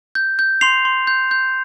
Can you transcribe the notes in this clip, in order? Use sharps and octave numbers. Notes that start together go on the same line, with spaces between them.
G6
G6
C6 C7 F7
C6
G6
G6